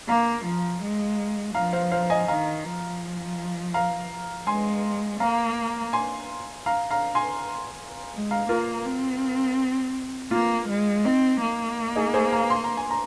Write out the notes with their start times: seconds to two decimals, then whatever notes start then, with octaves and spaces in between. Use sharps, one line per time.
0.08 A#3 F5 A#5
0.45 F3
0.83 G#3
1.54 F3 F5 A#5
1.73 C5 F5
1.92 C5 F5
2.10 D#5 G#5
2.28 D#3 F5 A#5
2.64 F3
3.74 F5 A#5
4.47 G#3 G#5 C6
5.20 A#3 F5 A#5
5.93 G#5 C6
6.66 F5 A#5
6.91 F5 A#5
7.15 G#5 C6
8.13 G#3
8.31 F5 A#5
8.49 A#3 F4 A#4
8.86 C4
10.31 A#3 F4
10.69 G#3
11.05 C4 D#4
11.41 A#3
11.96 D#4 G#4
12.14 G#4 C5
12.32 F5 A#5
12.50 C6
12.64 A#5
12.77 G#5
12.91 A#5